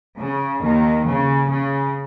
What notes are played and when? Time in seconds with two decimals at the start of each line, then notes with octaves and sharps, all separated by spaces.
0.18 C#3
0.61 D#2 D#3
1.06 C#3
1.49 C#3